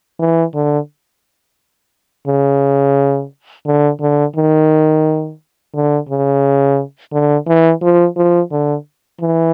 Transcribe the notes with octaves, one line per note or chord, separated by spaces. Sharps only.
E3
D3
C#3
D3
D3
D#3
D3
C#3
D3
E3
F3
F3
D3
E3